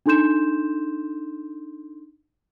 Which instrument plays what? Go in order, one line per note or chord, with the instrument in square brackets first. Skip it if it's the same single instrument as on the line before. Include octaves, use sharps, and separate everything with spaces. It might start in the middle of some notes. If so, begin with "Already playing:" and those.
[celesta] D4 D#4 A4 C6 G6 E7